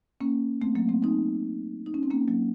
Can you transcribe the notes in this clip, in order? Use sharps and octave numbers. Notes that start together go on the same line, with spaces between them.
A#3 C#4
A3 C4
F#3 A#3
A3 C4
C4 D#4
D#4
C#4
C4
A#3 C#4
F#3 A#3